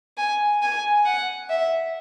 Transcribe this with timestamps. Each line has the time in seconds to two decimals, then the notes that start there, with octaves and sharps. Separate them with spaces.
0.18 G#5
0.62 G#5
1.06 F#5
1.50 E5